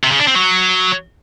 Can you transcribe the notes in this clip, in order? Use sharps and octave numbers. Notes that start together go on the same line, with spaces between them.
C3
C#3
D4
C4
F#3